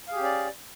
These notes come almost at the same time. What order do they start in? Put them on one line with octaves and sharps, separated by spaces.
F5 G#4 G4 C#4 D5